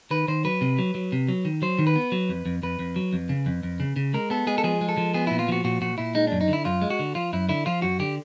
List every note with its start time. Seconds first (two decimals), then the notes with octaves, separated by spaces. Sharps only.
0.11 D#3 B4
0.28 D#3 C5
0.45 F#3 B4
0.61 C3
0.79 F#3
0.95 F#3
1.12 C3
1.28 F#3
1.45 D#3
1.62 F#3 C5
1.79 D#3
1.87 B4
1.96 B3
2.12 F#3
2.29 F2
2.46 F2
2.63 F2 B4
2.79 F2
2.96 F#3
3.13 F2
3.29 C#3
3.46 F2
3.63 F2
3.80 C#3
3.96 C#3
4.14 G#3 A#4
4.30 B3 A4
4.47 G#3 G#4
4.58 A4
4.64 F3 G#4
4.81 G#3
4.89 A4
4.98 F3
5.14 B3 G#4
5.27 A#2 E4
5.39 F4
5.48 F3 F#4
5.65 A#2 F#4
5.82 A#2 F#4
5.98 A#2 E4
6.15 G#3 D#4
6.27 F#2 D4
6.41 D#4
6.48 D3
6.53 E4
6.65 F#2 F4
6.82 G#3
6.90 F#4
6.99 D3
7.15 F3 F4
7.33 F#2 E4
7.49 D3 E4
7.66 F3 F4
7.82 F#2 F#4
8.00 D3 G4